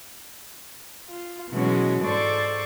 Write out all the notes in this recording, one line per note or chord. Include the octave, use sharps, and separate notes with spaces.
F4
B2 E3 F#3 G#3 C#4 F#4
G#2 A4 C5 D5 C#6 D6